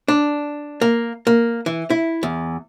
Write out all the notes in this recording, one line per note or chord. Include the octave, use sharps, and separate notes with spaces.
D4
A#3
A#3
E3
E4
E2